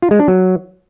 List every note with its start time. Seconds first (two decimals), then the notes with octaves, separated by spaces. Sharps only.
0.02 F4
0.11 G#3
0.19 D4
0.28 F#3